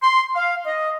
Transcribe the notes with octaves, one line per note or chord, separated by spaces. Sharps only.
C6
F5
D#5